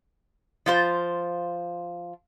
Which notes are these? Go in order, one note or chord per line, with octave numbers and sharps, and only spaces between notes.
F3 F4 C5